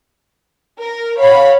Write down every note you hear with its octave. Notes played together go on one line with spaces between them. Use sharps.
A#4
C#5 F5 F#5 B5